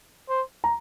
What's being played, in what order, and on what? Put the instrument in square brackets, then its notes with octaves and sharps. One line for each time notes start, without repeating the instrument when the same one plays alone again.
[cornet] C5
[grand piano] A#5